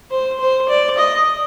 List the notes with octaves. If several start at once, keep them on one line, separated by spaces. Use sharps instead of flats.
C5
C5
D5
D#5